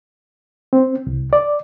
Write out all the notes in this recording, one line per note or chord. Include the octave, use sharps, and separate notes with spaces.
C4
C2
D5